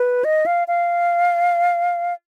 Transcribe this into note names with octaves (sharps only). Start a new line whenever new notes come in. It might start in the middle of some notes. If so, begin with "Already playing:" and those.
Already playing: B4
D#5
F5
F5